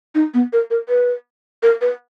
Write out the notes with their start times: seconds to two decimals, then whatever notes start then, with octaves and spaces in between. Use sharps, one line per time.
0.15 D#4
0.34 B3
0.53 A#4
0.71 A#4
0.89 B4
1.63 A#4
1.81 B4